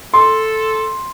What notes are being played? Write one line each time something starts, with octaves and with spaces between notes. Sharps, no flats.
A4 C6